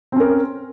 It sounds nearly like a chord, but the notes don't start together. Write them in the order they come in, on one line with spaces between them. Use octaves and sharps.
C4 C#4 A#4